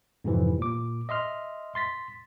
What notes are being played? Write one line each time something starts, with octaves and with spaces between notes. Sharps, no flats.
F2 G#2 C3 E3 F3
A#2 D6
D#5 E5 C6 F6
C6 A6 B6